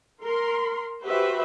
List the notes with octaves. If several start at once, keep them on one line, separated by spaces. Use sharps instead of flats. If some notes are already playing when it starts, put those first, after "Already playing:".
A#4 C6
F#4 G4 B4 C5 E5